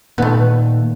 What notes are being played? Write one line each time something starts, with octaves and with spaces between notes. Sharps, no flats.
A#2 D#3 A3 B3